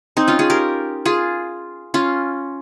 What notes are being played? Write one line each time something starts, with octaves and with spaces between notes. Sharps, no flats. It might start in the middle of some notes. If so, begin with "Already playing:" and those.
C4 D#4
C#4 F4
F4 G#4
G4 A#4
F4 G#4
C#4 F4